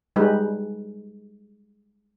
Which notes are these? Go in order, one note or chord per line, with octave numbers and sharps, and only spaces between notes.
G3 G#3 D#4 B4